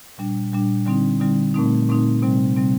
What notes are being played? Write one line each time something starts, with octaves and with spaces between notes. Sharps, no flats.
A#2 G3 D4
A#2 G3 D4
D3 G3 C4 D#4
D3 G3 C4 D#4
A#2 A3 C4 D#4
A#2 A3 C4 D#4
C3 G3 C4
C3 G3 C4